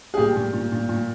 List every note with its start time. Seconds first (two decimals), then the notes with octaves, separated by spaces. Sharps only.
0.14 G#4
0.17 A#2 G4
0.36 A#2
0.53 A#2
0.72 A#2
0.89 A#2